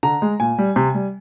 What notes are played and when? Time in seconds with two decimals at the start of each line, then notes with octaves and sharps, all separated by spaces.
0.03 D3 A#5
0.22 G#3
0.40 A#2 G#5
0.58 G3
0.76 C3
0.94 G3